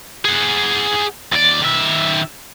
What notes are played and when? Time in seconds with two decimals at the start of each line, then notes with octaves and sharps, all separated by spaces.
0.25 G#4 F#5
1.32 D#2 D5
1.61 D#3 E5